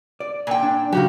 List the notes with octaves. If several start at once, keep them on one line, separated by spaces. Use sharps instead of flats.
D5
A#2 G5
D4
C#3 F#3 A#3 F#4 G4